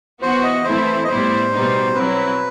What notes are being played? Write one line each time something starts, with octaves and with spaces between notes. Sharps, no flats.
E3 B3 F#4 C5
D#5
E3 A3 C4 E4 C5
D#5
A2 G3 B3 E4 C5
B2 G3 B3 D#4
F#3 C4 E4 B4